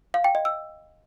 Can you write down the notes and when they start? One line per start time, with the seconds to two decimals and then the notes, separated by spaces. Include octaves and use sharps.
0.14 F5
0.24 G5
0.35 D#5
0.45 E6